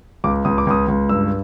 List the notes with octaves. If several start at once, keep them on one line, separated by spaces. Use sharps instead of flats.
C#2 D6
C#2 D#6
D6
C#2 D#6
C#2
G2 E6